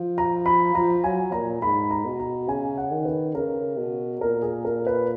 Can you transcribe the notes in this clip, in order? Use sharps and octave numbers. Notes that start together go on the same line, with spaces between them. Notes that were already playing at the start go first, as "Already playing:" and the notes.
Already playing: F3
A#5
B5
F3 A#5
F#3 G#5
A#2 A#5
G#2 B5
A#5
B2
A#5
C#3 G#5
F#5
D#3
B4
C#3 A#4
B2
A#2 A#4
G#4
A#4
B4